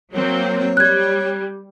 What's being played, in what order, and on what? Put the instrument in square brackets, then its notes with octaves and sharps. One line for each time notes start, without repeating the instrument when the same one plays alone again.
[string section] F#3 A#3 C4 [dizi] C#5
[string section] G3 [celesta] F#6 G#6